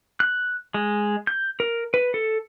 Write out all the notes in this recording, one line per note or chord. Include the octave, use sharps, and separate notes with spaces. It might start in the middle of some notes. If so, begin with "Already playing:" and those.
F#6
G#3
G6
A#4
B4
A4